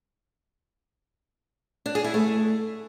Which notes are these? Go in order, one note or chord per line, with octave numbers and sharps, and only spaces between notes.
D4
G#4
E4
A3